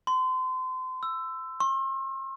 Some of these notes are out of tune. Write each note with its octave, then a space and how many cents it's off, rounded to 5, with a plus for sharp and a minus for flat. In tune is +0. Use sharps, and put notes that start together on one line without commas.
C6 -30
E6 +10
C6 +45